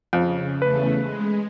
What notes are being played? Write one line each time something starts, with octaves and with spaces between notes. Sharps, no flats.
F2 C#3
E2 C#3 A3 B4
G#3